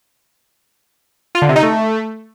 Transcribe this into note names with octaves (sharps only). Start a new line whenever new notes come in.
F4
D3
C3
D#4
A3